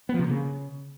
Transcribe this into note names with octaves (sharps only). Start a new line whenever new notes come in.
B3
F3
C3
A#3
C#3